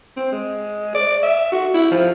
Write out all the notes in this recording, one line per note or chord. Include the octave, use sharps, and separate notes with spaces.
C4
G#3
D5
E5
F#4
E4
F3